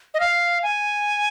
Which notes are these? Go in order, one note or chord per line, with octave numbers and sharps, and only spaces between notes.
D#5
F5
G#5